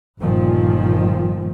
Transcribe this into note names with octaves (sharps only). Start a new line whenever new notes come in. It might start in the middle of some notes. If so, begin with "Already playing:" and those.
G1 A#2 D#3 F3